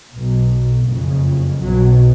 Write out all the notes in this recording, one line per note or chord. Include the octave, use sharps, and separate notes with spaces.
B1 B2
F#1 F2 C#3
B1 B2 F#3